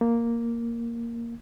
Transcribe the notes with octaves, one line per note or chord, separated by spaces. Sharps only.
A#3